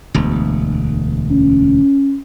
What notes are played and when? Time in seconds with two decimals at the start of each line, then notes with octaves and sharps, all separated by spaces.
0.14 E1 D2
1.31 C#4